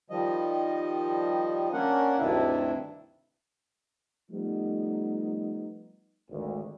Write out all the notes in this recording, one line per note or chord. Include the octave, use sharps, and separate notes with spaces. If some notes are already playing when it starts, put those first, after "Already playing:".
D#3 F3 G3 D#5
A#3 C#4 D4 A#4 F#5
D2 G2 C3 D#3 D4 E4
F3 G3 A3 B3 D#4
G#1 D2